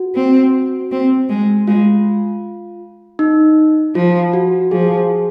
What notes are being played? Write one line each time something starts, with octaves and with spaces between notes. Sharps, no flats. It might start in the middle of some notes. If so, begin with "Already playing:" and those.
Already playing: F#4
C4
C4
G#3
G#3 F4
D#4
F3 F4
F#4
F3 G#4